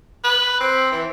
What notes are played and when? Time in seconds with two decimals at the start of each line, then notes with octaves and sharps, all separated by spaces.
0.24 B4
0.60 C4
0.92 E3